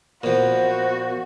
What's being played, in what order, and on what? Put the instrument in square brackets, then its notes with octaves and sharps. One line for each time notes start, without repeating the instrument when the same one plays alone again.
[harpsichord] A#2 F3 [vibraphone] B3 A#4 [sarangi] F#4 [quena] C5